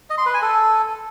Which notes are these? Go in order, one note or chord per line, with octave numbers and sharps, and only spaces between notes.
D#5
C6
B4
G#5
A4